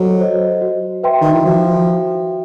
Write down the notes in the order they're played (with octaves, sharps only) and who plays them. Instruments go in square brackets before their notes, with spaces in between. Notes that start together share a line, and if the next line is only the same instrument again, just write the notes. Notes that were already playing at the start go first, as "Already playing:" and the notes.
Already playing: [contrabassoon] F#3 [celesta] A4 C5 D#5
[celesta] C5 D#5
F#4
B4 E5 G5 C6
[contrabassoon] D#3
E3
[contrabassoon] F3 [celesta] F#4